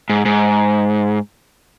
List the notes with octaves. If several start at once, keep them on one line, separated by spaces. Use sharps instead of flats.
G#2
G#2